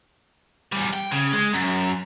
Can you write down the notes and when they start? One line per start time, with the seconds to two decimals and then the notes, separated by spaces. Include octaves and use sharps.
0.72 E2 G3
0.93 G5
1.11 C#3
1.33 G#3
1.53 F#2